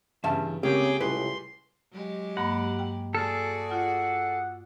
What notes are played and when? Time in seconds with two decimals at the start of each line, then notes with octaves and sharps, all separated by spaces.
0.24 E2 G2 C#3 E5 A5
0.63 C#2 C#3 A#3 C4 G4 G#4 G5 D6
1.00 C#2 A2 C3 G3 G#4 B4 C6
1.92 F#3 G#3 G4
2.37 G2 A#3 F#5 B5
2.79 G5
3.15 F#4 G#4 A4 D5 A5 F6
3.71 F4 F#5